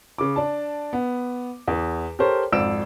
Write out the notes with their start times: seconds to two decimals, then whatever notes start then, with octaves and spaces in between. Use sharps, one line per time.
0.18 C#3 D6
0.36 D4 A5
0.93 B3
1.67 E2
2.19 G4 A4 A#4 C5 C#5
2.52 G#1 F2 D5 E6 D7 E7